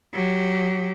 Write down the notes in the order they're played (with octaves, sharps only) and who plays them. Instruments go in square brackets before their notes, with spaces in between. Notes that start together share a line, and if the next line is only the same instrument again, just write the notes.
[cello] F#3 G4